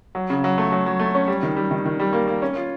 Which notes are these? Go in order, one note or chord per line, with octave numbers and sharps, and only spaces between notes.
F#3
C#3
F#3
A3
F#3
F#3
A3
C#4
G3
D#3
G3
D#3
D#3
G3
A#3
A#3
C#4
F4